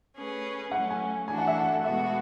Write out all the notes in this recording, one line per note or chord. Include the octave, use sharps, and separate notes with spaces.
A3 C#4 G#4 B4
F#3 A3 C#4 F#5
G#5
E3 A3 D4 F#4 A4 G#5
F#5
E5
F#5
B2 G#3 B3 F#4 A4 E5